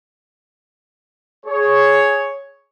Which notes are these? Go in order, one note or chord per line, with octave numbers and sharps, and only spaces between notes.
G#4 C#5